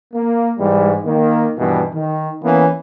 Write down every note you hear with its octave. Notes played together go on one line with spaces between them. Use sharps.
A#3
G#2 E3 G3
D#3 A#3
G2 B2 D#3 E3
D#3
E3 A#3 B3 C#4